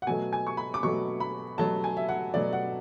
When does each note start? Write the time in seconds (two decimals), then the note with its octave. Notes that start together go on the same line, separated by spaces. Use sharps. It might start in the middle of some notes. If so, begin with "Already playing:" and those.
0.02 F#5
0.07 B2 F#3 A3 G#5
0.33 G#5
0.47 C#6
0.57 B5
0.74 D6
0.83 B2 F#3 A3 C#6
1.20 B5
1.58 B2 F#3 A3 A5
1.84 G#5
1.97 E5
2.09 F#5
2.34 B2 F#3 A3 D5
2.53 F#5